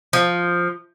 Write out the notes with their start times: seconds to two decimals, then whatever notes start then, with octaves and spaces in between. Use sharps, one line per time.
0.13 F3